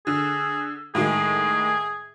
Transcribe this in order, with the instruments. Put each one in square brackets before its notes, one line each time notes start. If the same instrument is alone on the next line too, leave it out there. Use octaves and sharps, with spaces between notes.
[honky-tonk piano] D3 [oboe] G#4
[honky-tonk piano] A2 D#3 G#3 [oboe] G#4